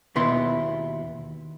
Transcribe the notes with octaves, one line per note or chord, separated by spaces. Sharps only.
D#2 B2 B3 E4 C6